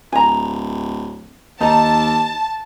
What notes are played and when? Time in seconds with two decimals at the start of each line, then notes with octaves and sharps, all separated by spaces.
0.12 D1 G#5 A#5
1.61 D#2 D#4 A5 A#5